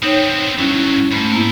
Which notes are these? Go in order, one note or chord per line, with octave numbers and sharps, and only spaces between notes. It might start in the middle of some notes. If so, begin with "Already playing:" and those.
B3 C4 D#4 C#5 G5
G2 F#3 C#4 E4
G#2 A3 B5
A#3 B3 E4